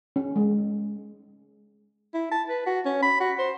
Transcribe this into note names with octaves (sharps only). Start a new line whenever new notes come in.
C#4
G#3
E4
A5
B4
F#4
C#4
B5
F#4
C5